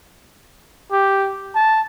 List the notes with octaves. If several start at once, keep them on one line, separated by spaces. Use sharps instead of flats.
G4
A5